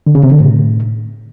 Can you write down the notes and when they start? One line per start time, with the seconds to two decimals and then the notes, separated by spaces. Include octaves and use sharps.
0.07 D3
0.15 C#3
0.23 C3
0.32 D3
0.40 A2